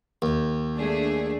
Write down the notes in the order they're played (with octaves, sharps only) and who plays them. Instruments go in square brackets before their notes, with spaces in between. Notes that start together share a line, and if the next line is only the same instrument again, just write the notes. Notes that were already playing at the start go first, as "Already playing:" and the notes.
[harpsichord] D#2
[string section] A3 D4 G#4